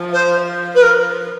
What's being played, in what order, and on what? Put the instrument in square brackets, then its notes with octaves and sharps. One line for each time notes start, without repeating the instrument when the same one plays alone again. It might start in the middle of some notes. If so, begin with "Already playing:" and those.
Already playing: [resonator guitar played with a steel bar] F3
[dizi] C5
B4
A#4